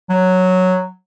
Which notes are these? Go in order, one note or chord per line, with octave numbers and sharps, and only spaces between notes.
F#3